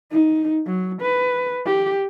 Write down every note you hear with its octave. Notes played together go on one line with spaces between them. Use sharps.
D#4
F#3
B4
G4